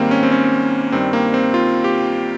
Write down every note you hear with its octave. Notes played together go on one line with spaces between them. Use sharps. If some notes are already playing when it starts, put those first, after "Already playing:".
Already playing: G#2 D#3 G3 A#3 C4
C#4
C4
C#4
G2 D#3 G3 C4
A#3
C4
F4
G4